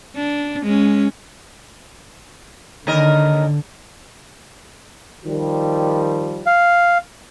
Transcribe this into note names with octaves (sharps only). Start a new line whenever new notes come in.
D4
G#3 C#4
D#2 D3 A#4 D#5
D#3 F3 G3
F5